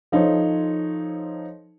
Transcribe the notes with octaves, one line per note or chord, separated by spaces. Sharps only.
F3 D#4 A4 C5 C#5